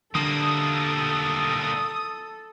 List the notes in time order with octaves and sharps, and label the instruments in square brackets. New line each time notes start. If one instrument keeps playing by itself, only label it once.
[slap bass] D3 [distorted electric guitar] G3 A#3 [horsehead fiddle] A4 [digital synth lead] D#6